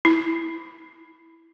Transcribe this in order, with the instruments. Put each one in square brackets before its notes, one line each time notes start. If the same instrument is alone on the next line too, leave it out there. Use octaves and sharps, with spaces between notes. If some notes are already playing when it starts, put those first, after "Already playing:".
[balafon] E4